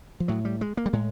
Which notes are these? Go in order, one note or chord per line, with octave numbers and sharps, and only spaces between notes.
F3
A2 F#3
G3
G#3
A#3
G3
A2 G#3